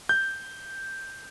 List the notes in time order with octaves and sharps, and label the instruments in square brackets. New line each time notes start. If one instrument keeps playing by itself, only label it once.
[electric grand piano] G6